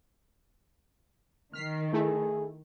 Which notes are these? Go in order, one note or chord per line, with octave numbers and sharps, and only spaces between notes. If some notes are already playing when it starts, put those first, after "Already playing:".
D#3 F6 B6 C7
A3 E4 G#4